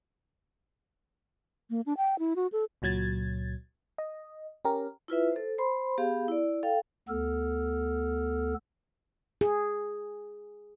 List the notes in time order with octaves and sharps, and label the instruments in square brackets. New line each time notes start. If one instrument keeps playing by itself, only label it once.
[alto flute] A#3
D4
G5
E4
F#4
A4
[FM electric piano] C#2 A#2 F#3 G#6 A6
D#5
C#4 G4 A#4
[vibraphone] E4 F4 B4 E5
A4 C5
C5 B5 C6
B3 G4 G#4 F5
E4 D5
A4 F5 G5
[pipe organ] D2 B3 A4 F6
[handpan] G#4